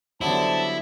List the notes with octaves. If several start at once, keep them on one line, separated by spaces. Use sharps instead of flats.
D3 F#3 G3 B3 E4 C5 A5